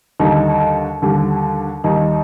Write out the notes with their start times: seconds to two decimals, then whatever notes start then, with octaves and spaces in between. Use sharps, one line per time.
0.20 D#2 D3 G3 D#4
1.02 D#2 D3 G3
1.84 D#2 D#3 G3 D#4